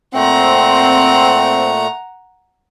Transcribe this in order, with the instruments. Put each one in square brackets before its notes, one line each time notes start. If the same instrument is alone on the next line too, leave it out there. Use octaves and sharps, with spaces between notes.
[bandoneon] A#2 A3 [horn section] C4 [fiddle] F#5 A#5